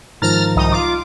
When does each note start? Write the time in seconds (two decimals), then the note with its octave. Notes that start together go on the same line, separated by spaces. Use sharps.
0.22 G#2 D#3 F3 A#5 F6 A6
0.56 C2 D#4 D#6
0.72 F4 D6